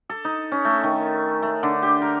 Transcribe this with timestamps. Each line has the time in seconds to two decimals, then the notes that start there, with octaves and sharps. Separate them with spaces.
0.09 A4
0.25 D#4
0.52 C#4
0.65 A3
0.83 D#3
1.42 A3
1.63 D3
1.82 G4
2.02 A#4